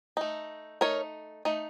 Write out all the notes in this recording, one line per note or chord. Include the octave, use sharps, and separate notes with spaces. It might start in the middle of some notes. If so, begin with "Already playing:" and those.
A3 D#4
A3 D#4 A#4 C#5
A3 D#4